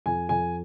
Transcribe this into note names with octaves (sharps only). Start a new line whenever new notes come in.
F2 G#5
F2 G#5